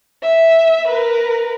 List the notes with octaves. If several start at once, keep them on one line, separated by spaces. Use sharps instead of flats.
E5
A#4 B4